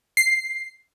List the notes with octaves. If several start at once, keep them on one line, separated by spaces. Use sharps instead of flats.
C7